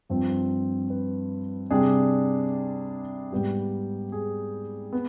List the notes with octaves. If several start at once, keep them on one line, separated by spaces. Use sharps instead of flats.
G2 F3 C4 C5
B4
C3 G3 D4 G#4
G#2 G3 B3 G4
G#4
B3